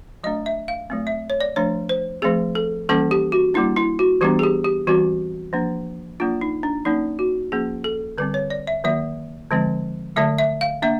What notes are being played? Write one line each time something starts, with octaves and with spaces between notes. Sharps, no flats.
F#3 A3 D4 D#5
E5
F5
F#3 A3 C4
E5
C#5
D5
F3 A3 D4 C#5
C5
F3 A3 C4 G#4
A4
E3 G3 A#3 C#4 A4
G4
F#4
G3 A#3 D4 E4
E4
F#4
E3 G3 B3 D4 G4
G#4
G4
G4
E3 G3 C4 F#4
F3 A#3 D4
F#3 A#3 D4 F4
D#4
D4
F#3 A#3 C#4 D#4
F#4
F3 A#3 C#4 G#4
A4
D3 G3 C4 B4
C#5
D5
E5
D#3 F#3 A#3 E5
D3 F3 G#3 C4
D3 F#3 A3 E5
E5
F5
A#3 D4 E5